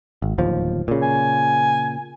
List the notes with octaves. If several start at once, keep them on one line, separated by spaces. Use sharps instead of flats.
G#1
D1 D#2 F3
A#2 C#3
G#5